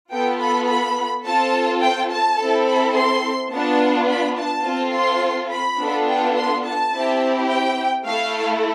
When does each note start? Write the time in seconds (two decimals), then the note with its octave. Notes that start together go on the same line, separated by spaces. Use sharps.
0.12 B3 F4 A4 G5
0.40 B5
0.69 B5
1.26 C4 F4 A4 A5
1.82 G5
2.11 A5
2.39 C4 E4 A4
2.67 B5
2.96 C6
3.52 B3 D4 F4 A5
4.09 B5
4.38 A5
4.66 C4 F4 A4
4.94 C6
5.51 B5
5.79 B3 D4 F4 A4
6.07 G5
6.36 C6
6.64 A5
6.93 C4 E4 G4
7.49 G5
8.06 A3 E4 A4 F5